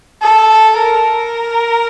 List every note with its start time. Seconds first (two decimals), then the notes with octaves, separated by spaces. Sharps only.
0.22 A4
0.78 A#4